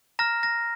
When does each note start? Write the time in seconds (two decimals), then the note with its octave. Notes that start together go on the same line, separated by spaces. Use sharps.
0.19 A#5 F6 A#6
0.43 A#6